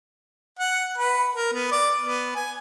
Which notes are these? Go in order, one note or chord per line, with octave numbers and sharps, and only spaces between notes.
F#5
B4
A#4
B3
D5
B3
G#5